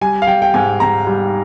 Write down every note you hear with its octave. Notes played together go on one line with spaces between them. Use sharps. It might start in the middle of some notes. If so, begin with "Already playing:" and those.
G3 G#5
F5
G3 G5
G5
G#2 G#5
G#2 A#5
G3